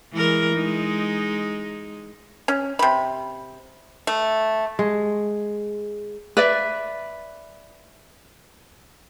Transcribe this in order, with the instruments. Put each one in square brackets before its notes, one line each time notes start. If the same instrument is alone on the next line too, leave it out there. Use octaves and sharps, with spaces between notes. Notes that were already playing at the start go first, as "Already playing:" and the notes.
[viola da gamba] E3 G#3 A#4
G#3 D#4
[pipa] C#4
C3 B5
A3
[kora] G#3
[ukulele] B4 D5 E5